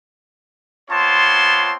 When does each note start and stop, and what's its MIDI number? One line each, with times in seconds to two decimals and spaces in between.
0.91 1.75 59
0.91 1.75 60
0.91 1.75 65
0.91 1.75 73
0.91 1.75 81
0.91 1.75 84